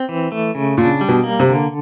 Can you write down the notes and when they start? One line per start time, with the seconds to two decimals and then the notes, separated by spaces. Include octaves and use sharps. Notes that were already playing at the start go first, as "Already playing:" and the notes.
Already playing: C4
0.09 E3
0.32 A3
0.55 C#3
0.77 A#2 D4
1.01 G3
1.09 B2
1.24 A#3
1.40 C3
1.47 D3